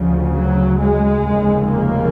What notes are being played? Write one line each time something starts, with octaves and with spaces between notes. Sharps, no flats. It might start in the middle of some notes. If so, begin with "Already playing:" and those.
Already playing: D2 C#3 F3
F#3
G#3
F1 D#2 C#3
A#3